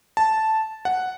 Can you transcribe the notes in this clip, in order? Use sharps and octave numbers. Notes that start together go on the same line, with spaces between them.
A5
F#5